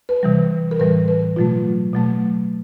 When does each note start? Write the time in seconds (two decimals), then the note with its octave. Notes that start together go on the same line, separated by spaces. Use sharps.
0.09 B4
0.23 C3 E3 G3
0.71 A#4
0.79 A2 E3 G3 B4
1.08 B4
1.36 B2 F#3 A3 F4
1.93 B2 F#3 A3